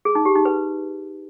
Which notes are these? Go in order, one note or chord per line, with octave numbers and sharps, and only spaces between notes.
G#4
D#4
G4
D#4
B4